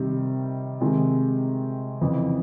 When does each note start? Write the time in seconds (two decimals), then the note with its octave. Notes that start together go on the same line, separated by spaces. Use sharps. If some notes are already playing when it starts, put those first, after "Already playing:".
Already playing: C3 D#3 G3
0.81 C3 D#3 G#3
2.01 F2 C#3 E3